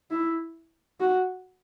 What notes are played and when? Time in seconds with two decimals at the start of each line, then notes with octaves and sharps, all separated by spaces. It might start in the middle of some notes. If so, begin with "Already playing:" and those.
0.11 E4
1.00 F#4